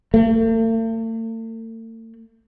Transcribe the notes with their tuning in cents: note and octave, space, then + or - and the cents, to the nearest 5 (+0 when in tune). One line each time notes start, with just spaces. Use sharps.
A3 +45